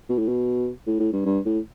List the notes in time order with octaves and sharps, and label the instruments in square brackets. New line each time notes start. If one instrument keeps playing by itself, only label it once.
[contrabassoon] B2
A2
B2
A2
A2
G2
G2
A2